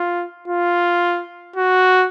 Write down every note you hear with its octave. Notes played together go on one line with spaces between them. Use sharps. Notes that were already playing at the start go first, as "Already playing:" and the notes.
Already playing: F4
F4
F#4